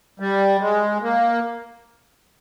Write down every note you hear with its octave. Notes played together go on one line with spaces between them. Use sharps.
G3
G#3
A#3